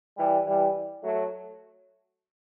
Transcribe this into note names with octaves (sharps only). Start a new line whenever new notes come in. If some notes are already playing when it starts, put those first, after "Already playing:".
E3 G3
E3 G3
F#3 A3